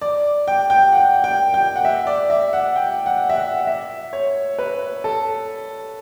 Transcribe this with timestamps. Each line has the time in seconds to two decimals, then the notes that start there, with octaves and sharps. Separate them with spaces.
0.02 D5
0.48 G5
0.70 G5
0.92 F#5
1.24 G5
1.54 G5
1.76 F#5
1.85 E5
2.07 D5
2.30 E5
2.53 F#5
2.76 G5
3.06 F#5
3.30 E5
3.37 F#5
3.67 E5
4.13 C#5
4.59 B4
5.04 A4